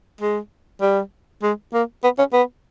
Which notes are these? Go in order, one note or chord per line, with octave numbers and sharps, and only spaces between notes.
G#3
G3
G#3
A#3
B3
C#4
B3